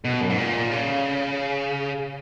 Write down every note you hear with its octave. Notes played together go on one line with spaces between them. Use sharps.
B2
F#2
G#2
A#2
C#3